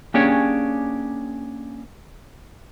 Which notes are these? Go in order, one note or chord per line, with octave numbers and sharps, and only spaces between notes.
A#3 C#4 D4 G4 G#4 C#5